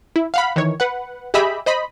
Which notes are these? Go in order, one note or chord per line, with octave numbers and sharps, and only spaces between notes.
E4
F5 F#5 B5
D#3 E3 C#5
B4 F#5
G4 G#4 D#5 E5 B5
C5 D#5 B5